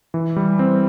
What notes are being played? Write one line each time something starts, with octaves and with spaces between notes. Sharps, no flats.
E3
G3
C4